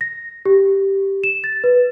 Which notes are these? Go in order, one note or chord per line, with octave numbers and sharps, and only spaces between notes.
A#6
G4
E7
A6
B4